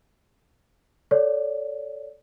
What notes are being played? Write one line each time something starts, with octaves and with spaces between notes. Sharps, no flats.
A4 C#5 D5